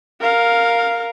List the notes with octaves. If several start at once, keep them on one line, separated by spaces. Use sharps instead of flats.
A#4 F5